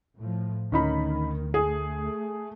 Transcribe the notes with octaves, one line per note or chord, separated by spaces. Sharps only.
A2 F3
D2 D#3 C#4 D#4 B5
A3 G#4